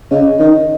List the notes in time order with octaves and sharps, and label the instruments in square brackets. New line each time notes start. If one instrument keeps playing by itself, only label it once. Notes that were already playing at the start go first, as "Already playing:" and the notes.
[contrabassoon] C#3 [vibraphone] D#5
[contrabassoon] D#3 [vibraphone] D#5